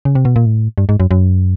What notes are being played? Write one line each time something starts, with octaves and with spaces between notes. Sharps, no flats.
C#3
C3
B2
A#2
A2
G2
G#2
F#2
F#2